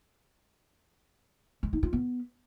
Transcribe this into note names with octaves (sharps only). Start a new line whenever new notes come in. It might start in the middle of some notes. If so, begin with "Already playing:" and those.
G#3
D#4
F4
B3